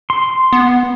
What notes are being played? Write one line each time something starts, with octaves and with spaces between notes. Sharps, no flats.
C6
B3